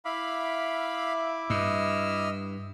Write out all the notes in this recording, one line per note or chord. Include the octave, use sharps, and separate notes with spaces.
E4 E5 F5 B5 D6
G2 D#5 E6 F6